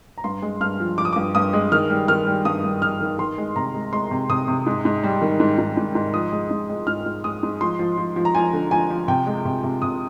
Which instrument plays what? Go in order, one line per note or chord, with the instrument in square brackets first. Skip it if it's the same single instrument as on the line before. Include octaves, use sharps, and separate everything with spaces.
[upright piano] A#5
G2 C6
G#3
G2 F6
F3
F3 D6
D#6
G2 D6
G2 D#6
G#3
D#3 F6
G3
D#3 F6
G3
G2 D#6
G2
D#3 F6
D#3
D#3 C6
G#3
C3 A#5
G#3
G#3 C6
C3
C3 D#6
C3
G#2
G#2
G3
D#3
G#2
G#2
G#2
G#2
F3 D#6
G#3
G#2
G#3
G#2 F6
G#2
G#3 D#6
G#2
F3 C6
F3
F3
F3
A#5
F3 G#5
D3
F3 G#5
F3
C3 G5
G#3
C3
C3
C3 D#6